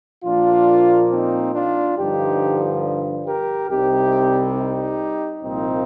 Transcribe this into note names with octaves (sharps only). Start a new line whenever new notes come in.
A#2 F3 A#3 D4 F4
C4 D#4
D4 F4
G2 D3 F3 D#4 G4
G4 A#4
C2 C3 G3 C4 D#4 G4
D#4 G4
C2 A#2 F3 A#3 C4 D#4